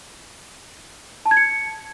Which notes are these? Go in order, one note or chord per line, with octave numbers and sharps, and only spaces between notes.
A5
G#6
C#7